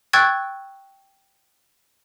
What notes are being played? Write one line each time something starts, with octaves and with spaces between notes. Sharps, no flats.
G5 C#6 E6 F#6 G#6 A6